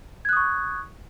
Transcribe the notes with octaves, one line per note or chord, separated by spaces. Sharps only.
C#6 D#6 F#6 G#6